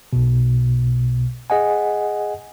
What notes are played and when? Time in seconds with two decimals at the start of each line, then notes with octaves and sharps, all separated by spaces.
0.13 B1 B2
1.50 G#4 D#5 F#5 G#5